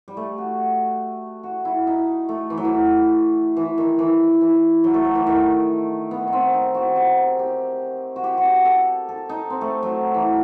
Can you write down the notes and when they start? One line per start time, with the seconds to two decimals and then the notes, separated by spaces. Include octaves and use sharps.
0.08 G3
0.17 A3
0.38 F#4
1.43 F#4
1.65 E4
1.87 D#4
2.29 A3
2.50 E3
2.57 F#3
2.65 E3
3.57 E3
3.78 D#3
3.99 E3
4.41 E3
4.84 F#3
4.94 A3
5.05 F#3
5.15 E3
5.27 D#3
6.11 B3
6.28 D#4
6.33 C4
6.54 D#4
6.75 F#4
6.96 G4
7.39 G4
8.16 F#4
8.24 G4
8.38 F#4
8.45 G4
8.65 A4
9.09 A4
9.29 D#4
9.50 C4
9.61 A3
9.83 F#3
10.14 E3